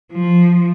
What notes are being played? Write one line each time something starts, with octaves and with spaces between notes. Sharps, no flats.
F3